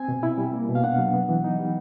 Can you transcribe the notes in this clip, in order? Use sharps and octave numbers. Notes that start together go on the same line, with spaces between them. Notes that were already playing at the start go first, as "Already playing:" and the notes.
Already playing: C4 G#5
B2
E4
G3
A#3
B2
F5
D4 F#5
F#3
B3
E3
D#4
G3